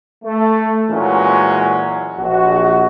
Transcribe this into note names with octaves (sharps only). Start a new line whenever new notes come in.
A3
A#2 E3 F#3 G#3 C#4
A#1 F#4